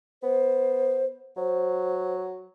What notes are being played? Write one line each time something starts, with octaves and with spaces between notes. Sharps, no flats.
B3 C5
F#3 C5